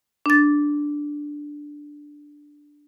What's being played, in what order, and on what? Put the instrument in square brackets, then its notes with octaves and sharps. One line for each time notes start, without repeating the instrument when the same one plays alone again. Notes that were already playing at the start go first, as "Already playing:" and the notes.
[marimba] D4 A6